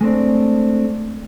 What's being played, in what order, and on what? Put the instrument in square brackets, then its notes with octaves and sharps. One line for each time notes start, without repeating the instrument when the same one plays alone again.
[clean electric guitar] G#3 A3 C4 D4